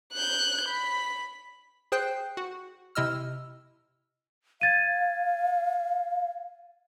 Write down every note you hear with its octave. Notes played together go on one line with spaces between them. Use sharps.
F#6 G6
B5
G#4 C5 G5 F#6 G6 C7
F#4
C3 E4 D#5 E6 F6
F5 G#6 A6 D#7